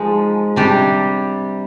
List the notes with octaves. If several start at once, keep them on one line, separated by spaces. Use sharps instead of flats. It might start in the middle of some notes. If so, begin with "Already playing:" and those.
Already playing: F3 G#3 D#4
C3 G3 D4 G4